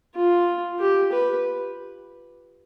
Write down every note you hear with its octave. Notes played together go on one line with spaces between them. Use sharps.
F4
G4
B4